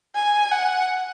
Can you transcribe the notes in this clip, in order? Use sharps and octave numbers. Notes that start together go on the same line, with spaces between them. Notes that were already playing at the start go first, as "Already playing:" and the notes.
G#5
F#5